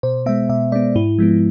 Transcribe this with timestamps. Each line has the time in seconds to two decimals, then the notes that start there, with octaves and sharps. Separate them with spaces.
0.03 B2 C5
0.26 G#3 B3 E5
0.49 B2 E5
0.72 G#3 B3 D5
0.95 G#2 E4
1.18 F3 G#3 B3